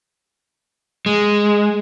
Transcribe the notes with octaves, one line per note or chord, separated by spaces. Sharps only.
G#3